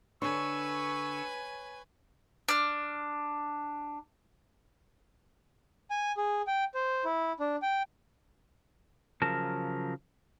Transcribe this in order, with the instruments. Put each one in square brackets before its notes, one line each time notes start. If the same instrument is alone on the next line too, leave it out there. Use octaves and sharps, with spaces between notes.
[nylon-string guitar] D3 D4 [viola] B4 G#5 [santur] C#5 [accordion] C#6 E6
[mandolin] D4 F6
[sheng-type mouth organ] G#5
G#4
G5
C5
E4
D4
G5
[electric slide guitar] C#3 F3 F#3 A#4 A5